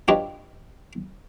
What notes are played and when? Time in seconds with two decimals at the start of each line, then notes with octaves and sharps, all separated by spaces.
0.08 D4 F4 G4 B4 C#5 D#5